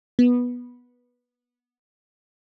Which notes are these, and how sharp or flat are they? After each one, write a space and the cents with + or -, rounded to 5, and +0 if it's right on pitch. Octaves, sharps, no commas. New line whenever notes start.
B3 -10